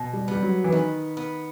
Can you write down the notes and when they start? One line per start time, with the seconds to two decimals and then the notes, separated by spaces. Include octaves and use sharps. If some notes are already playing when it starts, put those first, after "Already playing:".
Already playing: B2
0.13 G3
0.28 G3 B3
0.42 F#3
0.64 E3
0.72 D#3 B3
1.17 B3